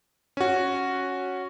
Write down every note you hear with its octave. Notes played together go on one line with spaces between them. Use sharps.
C#4 F#4